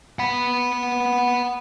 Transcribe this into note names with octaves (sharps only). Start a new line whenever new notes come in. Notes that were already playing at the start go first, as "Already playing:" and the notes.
F#5 B5